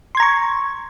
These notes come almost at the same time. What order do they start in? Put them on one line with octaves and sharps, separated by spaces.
C6 G#6 A#5 C#6